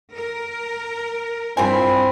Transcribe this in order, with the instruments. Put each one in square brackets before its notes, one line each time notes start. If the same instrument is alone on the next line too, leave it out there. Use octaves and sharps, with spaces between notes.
[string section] A#4
[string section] G2 [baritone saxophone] C4 [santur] E4 B4 B5 [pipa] F4 A#4 G#5